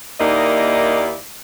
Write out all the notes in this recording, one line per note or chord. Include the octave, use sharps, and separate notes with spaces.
D#2 A#3 D#4 E4 D5 D#5